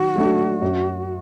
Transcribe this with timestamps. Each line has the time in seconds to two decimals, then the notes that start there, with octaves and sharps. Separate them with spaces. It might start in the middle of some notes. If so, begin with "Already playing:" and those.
Already playing: D#3 F#3 F#4
0.16 F#3 A3 D4
0.62 F#2